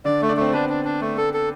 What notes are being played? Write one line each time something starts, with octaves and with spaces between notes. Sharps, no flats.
D3 D4 D5
A3
D4 D5
A3 C4 C5
C5
B3 D4 B4
D4
D4
A3
A4
A4